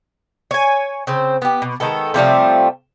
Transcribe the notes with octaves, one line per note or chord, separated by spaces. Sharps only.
C#5 G#5
C#3 C4 C5
B3 G4
B2
D#3 G#3 B3 A4
C3 F3 G3 A3